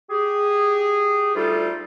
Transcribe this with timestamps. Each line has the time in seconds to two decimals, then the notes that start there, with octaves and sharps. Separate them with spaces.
0.10 G4 G#4
1.35 D2 G3 D#4 F4 A4